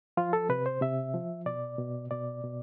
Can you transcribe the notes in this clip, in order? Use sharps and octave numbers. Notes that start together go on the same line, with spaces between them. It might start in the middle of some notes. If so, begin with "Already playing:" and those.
F3 F4
A4
C3 B4
C5
C3 E5
F3
B2 D5
B2
B2 D5
B2